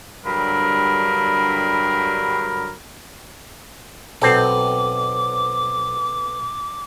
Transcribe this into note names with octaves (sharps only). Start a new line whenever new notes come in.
G2 D3 F#3 G3 A#4 B5
B1 B2 C4 A4 D6